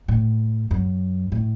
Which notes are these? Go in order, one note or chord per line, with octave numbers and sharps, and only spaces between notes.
A2
F#2
A2